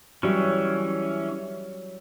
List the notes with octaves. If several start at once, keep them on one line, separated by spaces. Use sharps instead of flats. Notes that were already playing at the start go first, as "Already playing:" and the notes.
E3 F#3 G3 C#4